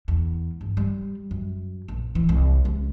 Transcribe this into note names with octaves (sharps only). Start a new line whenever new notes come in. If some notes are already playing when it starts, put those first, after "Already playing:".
E2
G1
G3
F#2
A#1
E3
C2
C#2